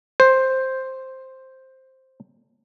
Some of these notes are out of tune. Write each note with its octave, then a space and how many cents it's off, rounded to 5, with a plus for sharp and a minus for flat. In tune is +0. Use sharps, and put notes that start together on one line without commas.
C5 +5